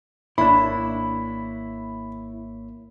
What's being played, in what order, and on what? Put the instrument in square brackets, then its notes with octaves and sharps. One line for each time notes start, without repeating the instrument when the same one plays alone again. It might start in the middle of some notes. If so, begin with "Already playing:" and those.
[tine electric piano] G#1 A#3 C#5 [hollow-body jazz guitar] D4 E4 [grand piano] B5